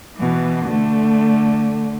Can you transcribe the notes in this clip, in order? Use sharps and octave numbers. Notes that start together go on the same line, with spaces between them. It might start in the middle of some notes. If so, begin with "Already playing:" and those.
B2 E3
D3 A3